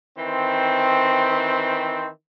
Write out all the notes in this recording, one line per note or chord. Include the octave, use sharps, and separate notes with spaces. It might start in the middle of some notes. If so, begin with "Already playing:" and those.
D#3 E3 C4